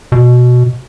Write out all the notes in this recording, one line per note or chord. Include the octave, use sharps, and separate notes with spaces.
B2